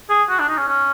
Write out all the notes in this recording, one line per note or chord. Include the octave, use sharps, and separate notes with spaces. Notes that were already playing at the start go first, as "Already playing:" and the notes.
G#4
F#4
D4
D#4
C#4
C#4